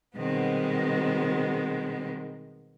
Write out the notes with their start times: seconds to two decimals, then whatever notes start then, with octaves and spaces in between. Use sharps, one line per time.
0.16 B2 D#3 G3 G#3 B3 C4